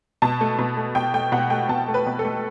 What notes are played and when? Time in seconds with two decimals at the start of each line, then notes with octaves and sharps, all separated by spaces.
0.22 B2 A5
0.41 A3
0.59 B2
0.77 A3
0.95 B2 G5
1.14 A3 G5
1.32 B2 F#5
1.50 A3 G5
1.69 B2 A5
1.88 A3
1.94 B4
2.06 B2
2.19 A4
2.25 A3